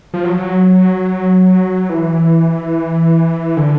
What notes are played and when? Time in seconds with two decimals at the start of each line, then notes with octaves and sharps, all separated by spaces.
0.14 F3
0.24 F#3
1.90 E3
3.57 D3